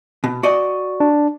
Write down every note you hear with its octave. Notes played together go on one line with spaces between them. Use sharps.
B2
F#4 D5 D#5
D4